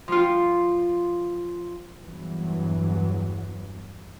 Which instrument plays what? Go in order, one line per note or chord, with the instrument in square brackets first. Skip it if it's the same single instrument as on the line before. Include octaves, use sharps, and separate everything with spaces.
[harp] F3 F4
[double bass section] E2 G2 E3 F#3